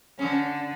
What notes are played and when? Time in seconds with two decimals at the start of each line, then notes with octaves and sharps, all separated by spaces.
0.19 D3 C#4